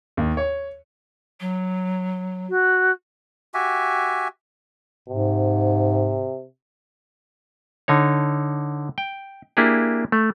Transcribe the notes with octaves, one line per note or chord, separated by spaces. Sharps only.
D#2
C#5
F#3
F#4
F#4 G4 E5 G#5
G#2 C3
D3 D#4 C#5
G5
A#3 D4 E4 G4 G#4
A3